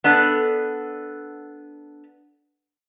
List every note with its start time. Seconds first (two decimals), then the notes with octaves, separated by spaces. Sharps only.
0.04 B3 D4 A4